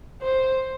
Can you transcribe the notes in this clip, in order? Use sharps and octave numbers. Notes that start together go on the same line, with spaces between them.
C5